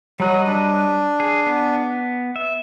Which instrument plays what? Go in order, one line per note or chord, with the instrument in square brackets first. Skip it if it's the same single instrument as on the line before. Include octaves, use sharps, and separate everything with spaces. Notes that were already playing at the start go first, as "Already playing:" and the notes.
[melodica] F#3 [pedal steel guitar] G3 B4 D#5
[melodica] D4
[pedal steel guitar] G#4
B3
E5